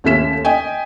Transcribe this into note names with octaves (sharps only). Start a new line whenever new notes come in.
D#2 A3 C#4 B6 E7
D#5 G5 G#5